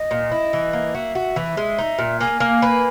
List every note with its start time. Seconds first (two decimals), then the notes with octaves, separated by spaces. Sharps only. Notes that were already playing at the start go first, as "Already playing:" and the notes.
Already playing: D#5
0.11 A#2
0.32 E4
0.53 E3
0.73 A#3
0.95 F#4 E5
1.15 F#4
1.36 E3
1.57 G#3
1.79 D#4
1.99 A#2
2.20 A#3 G#5
2.40 A#3
2.62 B4